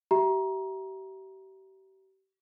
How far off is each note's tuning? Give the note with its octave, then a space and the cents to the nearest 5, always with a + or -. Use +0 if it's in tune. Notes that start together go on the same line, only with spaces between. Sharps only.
G4 -35 E5 +0 A#5 +25